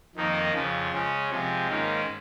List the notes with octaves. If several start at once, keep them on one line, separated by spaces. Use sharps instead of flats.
F2 D#3 A#3 D#4
F2 C#3 F3
C#3 G#3 C#4
C3 F3 G#3
G#2 D#3 A#3 C#4